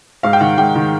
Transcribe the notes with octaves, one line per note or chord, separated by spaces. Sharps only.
G#2 F5
G5
D#3 F#5
G#2 G5
D#3